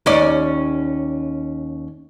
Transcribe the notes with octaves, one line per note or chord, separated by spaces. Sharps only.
D#2 C#4 D5